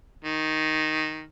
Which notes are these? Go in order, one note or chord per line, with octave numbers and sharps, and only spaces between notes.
D#3